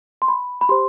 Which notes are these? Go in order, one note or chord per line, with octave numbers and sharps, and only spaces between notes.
C6
B5
B5
G4 C5 C6